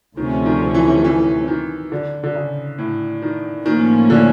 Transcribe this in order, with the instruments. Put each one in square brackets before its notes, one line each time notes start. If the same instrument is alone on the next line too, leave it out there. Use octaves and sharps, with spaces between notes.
[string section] D2 C3 F3 A3 C#4 [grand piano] D#3
[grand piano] D#3
E3
E3
D#3
D3
D3
C#3
A2
D#3
[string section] A2 F3 A#3 C#4 [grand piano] D#3
[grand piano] D3